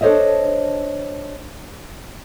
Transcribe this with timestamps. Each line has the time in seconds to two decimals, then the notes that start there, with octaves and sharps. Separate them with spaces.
0.01 D4 A4 C5 C#5 D#5 E5